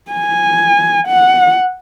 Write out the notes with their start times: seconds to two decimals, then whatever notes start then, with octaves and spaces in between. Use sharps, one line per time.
0.12 G#5
1.08 F#5